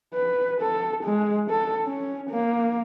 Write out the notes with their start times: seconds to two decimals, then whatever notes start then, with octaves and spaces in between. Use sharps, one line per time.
0.14 B4
0.61 A4
1.04 G#3
1.50 A4
1.86 C#4
2.30 A#3